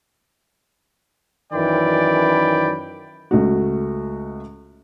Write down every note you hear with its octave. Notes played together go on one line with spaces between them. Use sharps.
F#2 D#3 E3 D5 G5 B5
C#2 A3 F#4